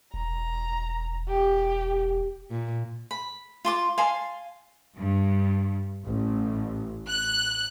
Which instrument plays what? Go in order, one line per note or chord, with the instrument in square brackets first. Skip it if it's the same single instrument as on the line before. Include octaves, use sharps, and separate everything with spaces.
[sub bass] E1 [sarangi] A#5
[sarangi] G4
[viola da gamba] A#2
[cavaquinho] B5
F4 C6 D6
F5 G#5 A5 C6
[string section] G2
A1
F#6